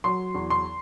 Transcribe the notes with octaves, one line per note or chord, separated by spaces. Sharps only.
F#3 C6
E2
C6